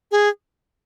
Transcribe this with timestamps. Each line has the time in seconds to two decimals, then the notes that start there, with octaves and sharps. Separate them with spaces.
0.11 G#4